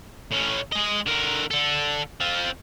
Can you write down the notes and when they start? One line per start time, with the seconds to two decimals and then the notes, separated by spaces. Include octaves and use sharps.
0.32 A2 C#4
0.72 G#3 D#5
1.07 D3 A#4
1.51 D3 A4
2.20 C4 F4